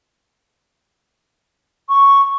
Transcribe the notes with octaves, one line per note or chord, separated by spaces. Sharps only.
C#6